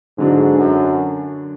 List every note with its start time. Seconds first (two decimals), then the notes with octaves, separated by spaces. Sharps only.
0.18 G#2 D3 F#3 D4
0.58 F#2